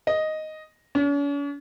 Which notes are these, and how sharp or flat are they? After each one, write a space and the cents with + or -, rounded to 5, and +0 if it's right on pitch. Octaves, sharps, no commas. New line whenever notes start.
D#5 +0
C#4 +45